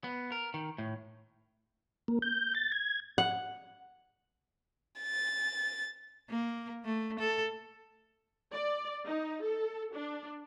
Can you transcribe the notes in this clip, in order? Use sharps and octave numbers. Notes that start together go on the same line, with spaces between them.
B3
A#4
D#3
A2
A#3
G6
A6
G#6
F#5
A6
A#3
A3
A4
D5
D#4
A4
D4